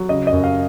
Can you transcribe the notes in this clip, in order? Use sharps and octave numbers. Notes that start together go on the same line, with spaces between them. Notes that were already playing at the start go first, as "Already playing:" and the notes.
Already playing: F#3
C#3 D#5
D#5
F#2
F5